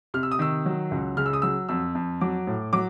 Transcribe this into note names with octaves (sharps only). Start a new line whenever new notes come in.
C3 F6
E6
D#6
D#3 E6
F#3
C#2
C#3 F6
E6
D#6
F#3 E6
F2 E6
F2
F#3 D6
A2
F#3 D6